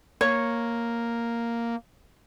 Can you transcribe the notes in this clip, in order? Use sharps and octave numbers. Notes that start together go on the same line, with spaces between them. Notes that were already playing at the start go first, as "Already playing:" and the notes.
A#3 C#5